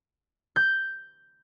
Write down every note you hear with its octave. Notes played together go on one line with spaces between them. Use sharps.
G6